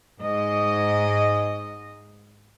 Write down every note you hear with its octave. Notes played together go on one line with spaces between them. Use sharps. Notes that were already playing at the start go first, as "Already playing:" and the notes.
G#2 D#5